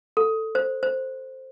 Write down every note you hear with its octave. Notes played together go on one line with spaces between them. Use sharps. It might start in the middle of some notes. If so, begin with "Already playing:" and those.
A4
C5
C5